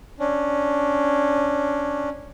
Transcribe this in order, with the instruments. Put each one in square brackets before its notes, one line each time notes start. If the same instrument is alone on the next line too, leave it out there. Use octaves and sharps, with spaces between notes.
[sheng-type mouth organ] C#4 D4